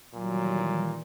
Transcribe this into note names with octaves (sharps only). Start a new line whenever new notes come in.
A#2 D#3 E3 F#3 G3